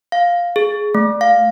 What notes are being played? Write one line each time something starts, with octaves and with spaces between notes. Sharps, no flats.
F5
G#4
A3
F5